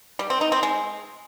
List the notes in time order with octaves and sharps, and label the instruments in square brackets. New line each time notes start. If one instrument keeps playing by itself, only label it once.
[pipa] G3
C4
D#4
C4
G#3